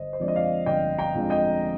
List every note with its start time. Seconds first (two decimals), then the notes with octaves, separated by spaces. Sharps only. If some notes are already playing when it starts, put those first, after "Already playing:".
Already playing: G1 C5 D#5
0.13 C5
0.20 F2 D3 F3 G#3 D5
0.28 D#5
0.35 D5 F5
0.66 G1 D#5 G5
0.98 G5 A#5
1.14 F2 D3 F3 G#3
1.30 D#5 G5